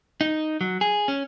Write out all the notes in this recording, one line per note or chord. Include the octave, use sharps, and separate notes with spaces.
D#4
F#3
G#4
C#4